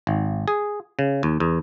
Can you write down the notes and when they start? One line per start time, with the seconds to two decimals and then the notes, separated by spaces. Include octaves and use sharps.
0.07 G#1
0.48 G#4
0.99 C#3
1.23 D#2
1.40 E2